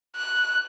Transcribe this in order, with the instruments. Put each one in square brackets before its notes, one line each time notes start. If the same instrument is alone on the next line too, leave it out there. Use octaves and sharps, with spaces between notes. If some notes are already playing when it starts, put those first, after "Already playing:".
[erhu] F#6